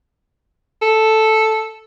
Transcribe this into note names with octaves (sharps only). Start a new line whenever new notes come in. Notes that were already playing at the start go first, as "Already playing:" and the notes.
A4